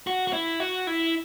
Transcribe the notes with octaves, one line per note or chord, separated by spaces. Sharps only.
F#4
F#4
E4
F#4
E4